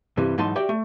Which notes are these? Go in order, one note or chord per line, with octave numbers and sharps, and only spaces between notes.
G2 C3 E3 G3
G#2 E3 F#3 D#4 A5 C6
F#4 G4 D5 E5 G5
A3